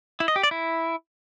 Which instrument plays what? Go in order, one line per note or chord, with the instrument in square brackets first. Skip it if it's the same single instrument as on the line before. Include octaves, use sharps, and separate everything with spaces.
[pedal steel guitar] E4
D#5
G4
D5
E4